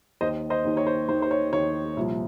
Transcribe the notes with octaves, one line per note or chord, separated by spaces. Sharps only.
D#2 D#3 C5 D#5
C5 D#5
D#2 D#3
C#5
C5
D#2 D#3 C5
C5
C#5
D#2 D#3 C#5
C2 A#2 F3